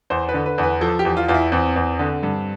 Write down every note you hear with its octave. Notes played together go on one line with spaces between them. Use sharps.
E2 C5
B4
D3
B4
E2
B4
F3 A4
G4
E2
F4
E2 F4
E4
E2 C4
E2
D3
G2